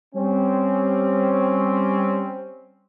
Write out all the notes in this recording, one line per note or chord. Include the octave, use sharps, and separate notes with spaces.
G3 C4 C#4